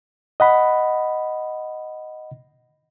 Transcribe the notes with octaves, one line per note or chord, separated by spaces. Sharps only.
D#5 F#5 B5